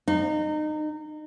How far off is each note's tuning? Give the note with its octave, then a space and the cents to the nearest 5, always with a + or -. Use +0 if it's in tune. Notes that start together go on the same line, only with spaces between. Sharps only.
D#4 -25